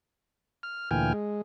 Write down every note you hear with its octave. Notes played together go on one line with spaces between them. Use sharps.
F6
D2 A#2 E3 G5 G#5 F6
G#3